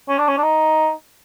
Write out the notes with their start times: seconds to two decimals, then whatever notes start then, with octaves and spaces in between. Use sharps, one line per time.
0.09 C#4
0.18 D4
0.28 C#4
0.38 D4
0.43 D#4